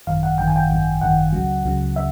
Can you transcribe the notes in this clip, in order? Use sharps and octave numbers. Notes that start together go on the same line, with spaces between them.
G#1 F#2 D#3 F5
F#5
G#1 F#2 D#3 G5
G#5
G5
G#1 F#2 D#3
G#1 F#2 D#3 F#5
C#2 C#3 F#3
C#2 C#3 F#3
C#3 E5